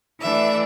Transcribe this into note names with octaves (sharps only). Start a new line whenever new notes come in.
E3 A3 D4 E5